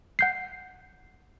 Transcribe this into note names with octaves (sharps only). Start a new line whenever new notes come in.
F#5 G6 C7